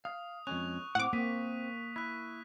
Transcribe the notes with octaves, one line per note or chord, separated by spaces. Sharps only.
F5 D#6
F2 G#3 C#4 C#6 F#6 F7
A2 C4 F#5 D6
A#3 C4 D#6 B6 D#7
E4 F#6 B6